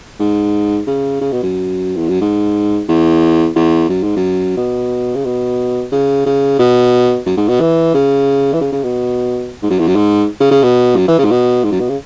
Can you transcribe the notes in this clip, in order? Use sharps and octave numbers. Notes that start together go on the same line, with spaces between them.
G#2
C#3
C#3
B2
F#2
E2
F#2
G#2
E2
E2
F#2
G#2
F#2
B2
C#3
B2
C#3
C#3
B2
F#2
G#2
B2
E3
C#3
E3
C#3
C#3
B2
G#2
F#2
E2
F#2
G#2
C#3
C#3
B2
F#2
E3
C#3
G#2
B2
G#2
F#2
B2
C#3